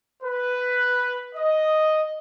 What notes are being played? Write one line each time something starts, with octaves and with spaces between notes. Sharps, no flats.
B4
D#5